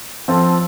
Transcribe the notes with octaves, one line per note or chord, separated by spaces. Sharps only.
F3 C4 F4 A4